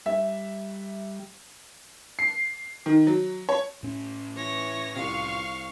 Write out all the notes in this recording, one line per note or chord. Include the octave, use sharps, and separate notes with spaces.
G3 E5
C7
D#3
F#3
C#5
A2 C#4
E3 C#5 A#6
C2 C3 F4 F5 C#6